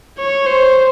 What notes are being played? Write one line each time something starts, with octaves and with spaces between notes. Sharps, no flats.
C#5
C5